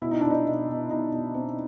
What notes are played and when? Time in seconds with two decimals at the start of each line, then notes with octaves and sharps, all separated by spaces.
0.02 B2 E4
0.11 D#4
0.21 B2 D4
0.30 D#4
0.46 B2
0.69 B2
0.90 B2 D#4
1.12 B2
1.34 C4